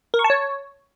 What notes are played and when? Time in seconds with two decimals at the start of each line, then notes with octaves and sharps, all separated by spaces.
0.14 A#4
0.19 C#6
0.24 A5
0.30 C#5